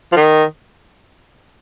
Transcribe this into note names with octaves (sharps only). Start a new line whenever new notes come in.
F3
D#3